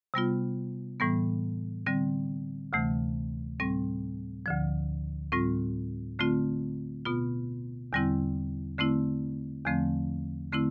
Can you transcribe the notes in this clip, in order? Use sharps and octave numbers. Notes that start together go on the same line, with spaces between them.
C3 G3 B3 F4
A2 E3 G3 B3
D3 G3 C4
D2 C3 E3 A3
A2 G3 C4
D2 D3 F3
A2 G3 C4 F4
D3 A3 C4 F4
B2 B3 F4
E2 D3 G3 C4 E4
D3 A3 C4 E4
E2 D3 F3 A3 C4
D3 A3 C4 E4